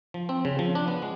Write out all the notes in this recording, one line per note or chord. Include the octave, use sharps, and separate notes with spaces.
F3
C4
C#3
F3
D4
B3
G#3